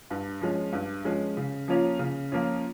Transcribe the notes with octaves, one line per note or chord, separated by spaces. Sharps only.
G2
F3 G#3 C#4
G2
F3 G#3 C#4
C#3
F3 A#3 C#4 F4
C#3
F3 A#3 C#4 F4